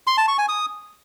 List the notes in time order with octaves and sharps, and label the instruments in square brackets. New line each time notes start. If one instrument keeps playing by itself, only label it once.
[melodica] C6
A5
C#6
G#5
D#6